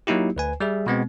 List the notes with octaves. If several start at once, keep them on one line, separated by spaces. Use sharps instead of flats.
F#3 A#3 D#4 E4 G4
D2 B4 G#5
G3 G#4 E5
B2 G#3 B3 C4